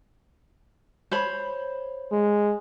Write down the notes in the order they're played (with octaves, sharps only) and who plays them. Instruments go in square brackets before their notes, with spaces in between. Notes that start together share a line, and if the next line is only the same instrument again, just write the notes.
[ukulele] C5 C#5 B5
[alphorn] G#3